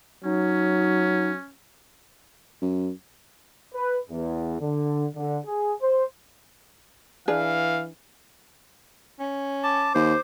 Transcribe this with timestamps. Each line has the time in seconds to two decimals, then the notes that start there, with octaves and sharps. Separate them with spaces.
0.24 F#3 C#4 D#4
2.62 F#2
3.74 B4
4.09 E2
4.61 D3
5.15 D3
5.45 G#4
5.81 C5
7.28 E3 D4 G#4 B4 F5
9.20 C#4
9.64 A5 D6
9.95 D#2 C5